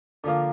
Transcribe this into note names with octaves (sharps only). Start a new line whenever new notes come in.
D3 F3 A#3